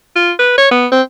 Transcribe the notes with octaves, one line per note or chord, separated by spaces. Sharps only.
F4
B4
C#5
B3
C4